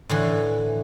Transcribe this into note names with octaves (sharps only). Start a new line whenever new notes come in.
A2 D3 E3